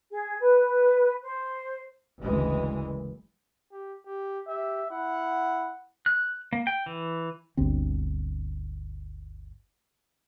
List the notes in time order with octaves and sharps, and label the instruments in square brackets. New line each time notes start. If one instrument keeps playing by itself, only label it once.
[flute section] G#4
B4
C5
[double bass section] F#1 D2 E3 G#3
[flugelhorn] G4
G4
[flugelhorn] G4 [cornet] E5
[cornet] E4 [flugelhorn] F#5
[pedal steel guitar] F#6
A#3
G5
E3
[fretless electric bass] G1 D2 C4